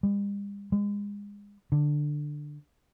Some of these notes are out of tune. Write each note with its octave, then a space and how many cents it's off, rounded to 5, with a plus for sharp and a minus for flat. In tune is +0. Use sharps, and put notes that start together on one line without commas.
G3 +45
G#3 -30
D3 +10